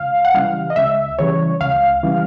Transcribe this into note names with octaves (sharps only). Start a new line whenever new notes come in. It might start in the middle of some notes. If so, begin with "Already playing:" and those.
Already playing: C#2 F5
F#5
C#3 E3 G3 F5
D#5
C#2 E5
C#3 E3 G3 C#5
C#2 F5
C#3 E3 G3